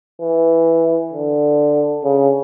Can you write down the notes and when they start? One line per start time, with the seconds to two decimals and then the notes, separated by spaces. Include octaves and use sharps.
0.21 E3
1.13 D3
2.03 C#3